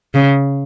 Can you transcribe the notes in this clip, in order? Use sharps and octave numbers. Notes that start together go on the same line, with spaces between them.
C#3